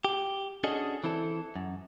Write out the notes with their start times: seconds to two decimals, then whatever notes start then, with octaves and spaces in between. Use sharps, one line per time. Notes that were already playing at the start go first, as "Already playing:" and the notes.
0.05 G4
0.64 C#4 D4 F#4 G#4 A4 D#5
1.04 E3 C4 E4 A4
1.56 F#2